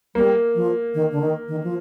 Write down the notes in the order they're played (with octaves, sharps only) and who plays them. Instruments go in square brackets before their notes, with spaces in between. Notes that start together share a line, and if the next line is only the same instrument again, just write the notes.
[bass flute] G3 [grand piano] A#3
[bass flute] F3
D#3
D3
D#3
D#3
F3